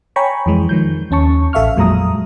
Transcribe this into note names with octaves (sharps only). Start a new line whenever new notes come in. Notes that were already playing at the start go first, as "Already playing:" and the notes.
C#5 G5 G#5 A#5 B5 C#6
F2 E3 G#3
D#3 F3 G6
D#2 C#4 A5 C#6
A1 A4 E5 F5 C#6 F6
F2 A#2 F#3 G#3 A#5 D#6